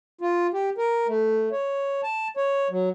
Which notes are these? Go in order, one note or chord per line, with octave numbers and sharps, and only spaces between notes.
F4
G4
A#4
A3
C#5
A5
C#5
F#3